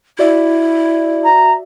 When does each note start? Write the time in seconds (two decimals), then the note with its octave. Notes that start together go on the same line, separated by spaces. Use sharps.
0.19 E4 F#4 D5 E5
1.23 A#5